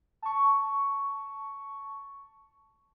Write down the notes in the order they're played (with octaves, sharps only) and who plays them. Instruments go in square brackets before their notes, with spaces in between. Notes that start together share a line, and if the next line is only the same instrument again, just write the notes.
[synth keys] A5 C#6